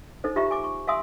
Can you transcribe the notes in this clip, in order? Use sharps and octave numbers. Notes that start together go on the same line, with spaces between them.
D#4 A4 C5
D#4 F4 G4 E5 A#5 C#6
G#5 D6
C#6
E5 F5 G#5 C6 D#6 E6